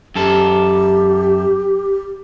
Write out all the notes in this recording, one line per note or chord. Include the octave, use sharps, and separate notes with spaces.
F#2 G4 A4